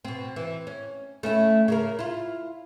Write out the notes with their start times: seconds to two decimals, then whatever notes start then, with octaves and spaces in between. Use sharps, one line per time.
0.05 B2 C4
0.36 E3
0.67 C#4
1.23 A3 C#4 E4
1.68 C#3 A#3 A#4
1.99 E4 F4